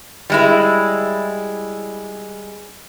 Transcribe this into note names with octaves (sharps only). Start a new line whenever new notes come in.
G3 G#3 E4